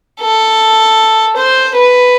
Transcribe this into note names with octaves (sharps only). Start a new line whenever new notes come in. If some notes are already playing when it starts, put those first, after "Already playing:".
A4
C5
B4